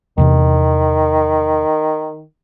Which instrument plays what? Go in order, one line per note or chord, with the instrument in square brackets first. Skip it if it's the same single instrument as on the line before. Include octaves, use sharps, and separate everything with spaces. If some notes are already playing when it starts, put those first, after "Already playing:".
[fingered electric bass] E2 C3 E3 [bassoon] D#3